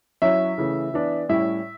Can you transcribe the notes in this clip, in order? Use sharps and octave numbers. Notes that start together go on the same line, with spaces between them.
F#3 C#4 E4 E5
C#3 E3 A3
E3 B3 D4
A2 G3 C#4 E4 E5